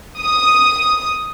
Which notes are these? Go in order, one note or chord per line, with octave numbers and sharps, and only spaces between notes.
D#6